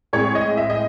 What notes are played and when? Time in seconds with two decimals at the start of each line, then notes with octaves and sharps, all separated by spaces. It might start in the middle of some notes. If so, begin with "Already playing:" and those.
0.13 A2 G#3 C4 C#5
0.35 D#5
0.57 E5
0.70 D#5